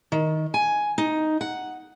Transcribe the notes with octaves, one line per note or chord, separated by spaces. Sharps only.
D#3
G#5
D#4
F#5